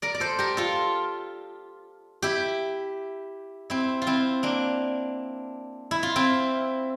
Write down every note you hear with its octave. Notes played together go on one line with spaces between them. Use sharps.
A#4 D5
D5
A4 C5
G4 A#4
F4 A4
E4 G4
C4 E4
F4
C4 E4
A#3 D4
E4
F4
C4 E4